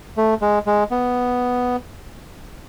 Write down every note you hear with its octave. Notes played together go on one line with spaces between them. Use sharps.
A3
G#3
G#3
B3